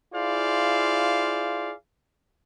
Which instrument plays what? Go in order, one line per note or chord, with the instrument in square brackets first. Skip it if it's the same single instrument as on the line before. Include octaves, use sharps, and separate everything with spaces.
[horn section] E4 F4 G#4 C5 D5 F5